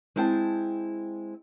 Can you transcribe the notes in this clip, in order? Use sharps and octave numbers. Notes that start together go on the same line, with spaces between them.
G#3 C4 E4 G5 A5